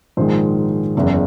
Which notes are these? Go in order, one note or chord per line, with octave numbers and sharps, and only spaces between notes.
A#1 G#2 D#3 G#3 C5
F#1 E2 C#3